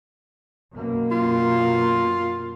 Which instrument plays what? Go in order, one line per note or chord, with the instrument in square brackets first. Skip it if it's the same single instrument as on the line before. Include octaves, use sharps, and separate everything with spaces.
[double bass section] F#2 B2 A#3
[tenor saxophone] F4